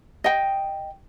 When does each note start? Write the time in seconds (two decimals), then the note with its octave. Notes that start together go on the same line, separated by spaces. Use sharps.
0.24 D#5 G5